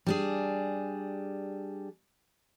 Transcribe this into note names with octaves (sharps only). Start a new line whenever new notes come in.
G3 D4 G#4